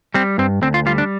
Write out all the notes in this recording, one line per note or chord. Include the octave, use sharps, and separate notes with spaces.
G3 C4
G2 C4
D2 C4
F4
G3 F4
D4